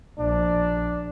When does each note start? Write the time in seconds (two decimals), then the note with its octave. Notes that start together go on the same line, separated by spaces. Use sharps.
0.20 A#1 D4